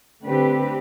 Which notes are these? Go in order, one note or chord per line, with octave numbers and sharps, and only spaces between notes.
D3 A3 C4 G4 B4